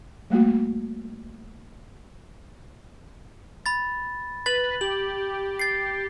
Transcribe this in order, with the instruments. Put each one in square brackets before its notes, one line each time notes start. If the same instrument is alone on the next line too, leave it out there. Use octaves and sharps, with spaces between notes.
[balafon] G3 A3 A#3 F#4
[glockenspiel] B5 A6
[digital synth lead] B4 [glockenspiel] A6 F#7
[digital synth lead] G4 [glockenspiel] F#7
[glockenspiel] A6 C7